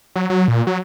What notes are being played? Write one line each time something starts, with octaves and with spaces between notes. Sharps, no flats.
F#3
F#3
A#2
F#3